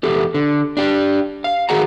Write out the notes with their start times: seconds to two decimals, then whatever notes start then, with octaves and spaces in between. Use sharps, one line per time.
0.03 E2 G4 A4
0.34 D3
0.77 D4 G4
1.44 F5
1.69 D#3 F#4 G#4 F#5 A#5